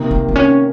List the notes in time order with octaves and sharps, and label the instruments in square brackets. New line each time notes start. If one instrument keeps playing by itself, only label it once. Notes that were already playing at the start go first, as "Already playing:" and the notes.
Already playing: [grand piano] C3 D#3 A#3
[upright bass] C4
C4
C#4